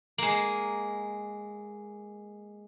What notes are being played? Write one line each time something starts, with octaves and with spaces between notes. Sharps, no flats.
G#3 A#3